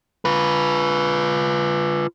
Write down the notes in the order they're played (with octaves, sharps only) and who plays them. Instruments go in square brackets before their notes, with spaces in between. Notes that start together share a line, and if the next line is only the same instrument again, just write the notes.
[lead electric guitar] F4 B4